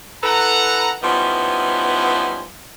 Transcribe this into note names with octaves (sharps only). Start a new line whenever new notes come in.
E4 A4 B4 F#5 A#5
F3 G3 B3 C#4 D#4 E4